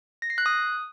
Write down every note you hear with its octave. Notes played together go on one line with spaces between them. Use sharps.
A#6
C7
F#6
D#6